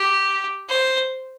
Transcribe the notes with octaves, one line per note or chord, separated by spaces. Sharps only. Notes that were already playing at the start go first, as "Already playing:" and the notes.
Already playing: G4
C5